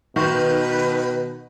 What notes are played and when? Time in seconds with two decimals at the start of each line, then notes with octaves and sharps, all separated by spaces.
0.16 B2 D#3 F#4 B4 C5 F5